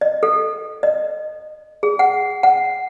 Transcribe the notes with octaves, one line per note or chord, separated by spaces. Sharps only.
D#5
A4
D#5
G#4
F#5
F#5